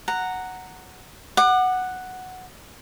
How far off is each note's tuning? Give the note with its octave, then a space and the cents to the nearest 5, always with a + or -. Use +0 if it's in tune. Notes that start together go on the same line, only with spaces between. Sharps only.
F#5 +0 A#5 -10
F#5 +0 D6 +40